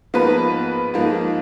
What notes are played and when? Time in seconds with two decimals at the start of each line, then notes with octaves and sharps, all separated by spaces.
0.14 G#2 F3 A#3 B3 B4
0.94 G#2 F3 A#3